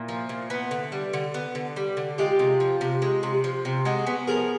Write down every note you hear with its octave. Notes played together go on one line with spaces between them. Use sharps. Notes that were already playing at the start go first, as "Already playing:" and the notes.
Already playing: A#2 E4
F3
A#2
B3
D3
G3
D3
B3
D3
G3
D3
G#3 F4 G4
C3
F3
C3
G#3
C3
F3
C3
G#3 F#4 G#4
B3
F3 G#4 A#4